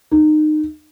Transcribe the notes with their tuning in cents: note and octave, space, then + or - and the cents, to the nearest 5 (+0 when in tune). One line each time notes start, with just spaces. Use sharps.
D#4 -25